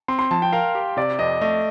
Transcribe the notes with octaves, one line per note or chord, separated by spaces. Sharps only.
C4 C6
C6
F3 A5
G5
A#4 F5
G4
C3 D5
F2 D#5
A3 D#5